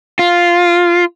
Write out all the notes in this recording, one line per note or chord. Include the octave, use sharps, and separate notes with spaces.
F4